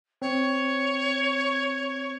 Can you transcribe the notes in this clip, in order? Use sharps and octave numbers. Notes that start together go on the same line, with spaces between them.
C4 C#5